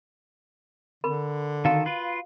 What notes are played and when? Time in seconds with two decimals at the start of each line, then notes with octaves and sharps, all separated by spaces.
1.04 D3 A#4 B5
1.65 D#3 F#4 A4 F5
1.86 F4 B4